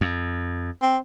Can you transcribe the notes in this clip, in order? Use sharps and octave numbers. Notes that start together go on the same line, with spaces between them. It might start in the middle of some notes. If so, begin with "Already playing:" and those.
F2
C4